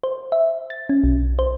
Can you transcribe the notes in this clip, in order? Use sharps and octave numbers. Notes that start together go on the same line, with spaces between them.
C5
E5
A6
C#4
B1
C5